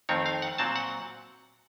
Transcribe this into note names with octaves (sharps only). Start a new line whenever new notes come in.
F2 D#3 A3 C4 C#5
F5
F#5
A#2 F#3 C4 A5
F#5